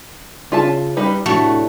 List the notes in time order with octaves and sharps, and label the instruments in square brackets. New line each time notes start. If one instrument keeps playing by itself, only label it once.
[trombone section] C#3 [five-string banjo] F4 E5 A5
[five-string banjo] G3 D#4 B4
[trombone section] A2 C3 D4 [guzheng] A3 [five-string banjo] F#4